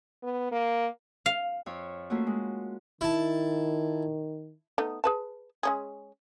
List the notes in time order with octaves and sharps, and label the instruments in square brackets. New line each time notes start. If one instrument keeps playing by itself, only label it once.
[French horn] B3
A#3
[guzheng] F5
[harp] F2 C#5 F5
A3 A#3 C#4 F4 F#4
G#3
[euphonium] D#3 [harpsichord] E4 A5
[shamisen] A3 B3 D#4
G#4 B4 A5
G#3 C#4 G#4